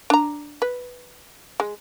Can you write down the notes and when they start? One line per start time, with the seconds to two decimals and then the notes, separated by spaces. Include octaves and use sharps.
0.10 D4 A#5
0.62 B4
1.60 G#3